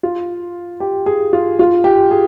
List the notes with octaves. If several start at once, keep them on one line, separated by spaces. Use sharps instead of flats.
F4
G4
G#4
F4
F4
G4
G#4